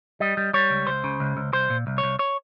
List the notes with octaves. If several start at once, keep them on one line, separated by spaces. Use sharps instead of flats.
G3 D#5
G3
G3 C#5
C#2
C#2 C5
C#3
C#2
C#2
C2 C5
A#2
C2
C#5
C2
C#5